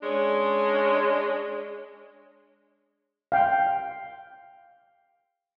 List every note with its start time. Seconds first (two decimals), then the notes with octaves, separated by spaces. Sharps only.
0.03 G#3 C#4 D4
3.32 F5 G5